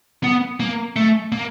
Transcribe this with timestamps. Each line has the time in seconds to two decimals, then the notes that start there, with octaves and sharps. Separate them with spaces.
0.23 B3
0.60 A#3
0.96 A3
1.32 A#3